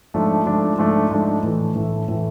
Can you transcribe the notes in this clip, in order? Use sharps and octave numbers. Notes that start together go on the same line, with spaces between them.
G#2 F3 A3 D4
G#2 F3 A3 D4
G#2 F3 A3 D4
G#2 F3 A3 D4
A2 E3 A3
A2 E3 A3
A2 E3 A3